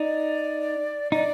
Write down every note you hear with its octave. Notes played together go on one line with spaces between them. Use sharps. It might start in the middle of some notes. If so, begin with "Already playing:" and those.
Already playing: D#4 D5
D#4 D5